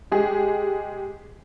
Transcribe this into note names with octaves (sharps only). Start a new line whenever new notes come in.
G#3 G4 G#4